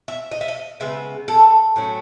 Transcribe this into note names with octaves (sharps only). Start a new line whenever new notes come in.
E5
D#5
E5
D#5
C#3 G#3 B3 E5
A4
A2 F#3 A3 C#4